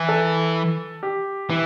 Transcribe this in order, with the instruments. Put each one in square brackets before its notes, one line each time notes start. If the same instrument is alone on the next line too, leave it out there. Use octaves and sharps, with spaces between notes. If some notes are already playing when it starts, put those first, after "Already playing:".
Already playing: [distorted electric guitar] E3
[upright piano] A4
G4
[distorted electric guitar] E3